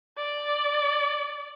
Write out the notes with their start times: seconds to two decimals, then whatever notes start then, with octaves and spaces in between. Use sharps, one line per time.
0.17 D5